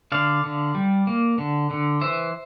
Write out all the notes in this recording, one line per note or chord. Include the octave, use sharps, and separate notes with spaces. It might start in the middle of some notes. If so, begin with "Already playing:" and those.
D3 D5 F5
D3
G3
A#3
D3
D3
E3 C5 E5